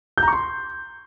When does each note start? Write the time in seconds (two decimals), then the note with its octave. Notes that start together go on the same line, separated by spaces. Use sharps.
0.18 G6
0.23 A#5
0.28 C#6
0.33 C6